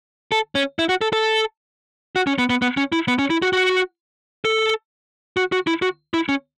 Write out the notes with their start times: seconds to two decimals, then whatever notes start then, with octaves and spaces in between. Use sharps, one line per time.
0.32 A4
0.55 C#4
0.79 E4
0.89 F#4
1.01 A4
1.13 A4
2.16 F#4
2.27 C#4
2.39 B3
2.50 B3
2.62 B3
2.77 C#4
2.92 E4
3.08 B3
3.19 C#4
3.30 E4
3.42 F#4
3.53 F#4
4.45 A4
5.37 F#4
5.52 F#4
5.67 E4
5.82 F#4
6.14 E4
6.29 C#4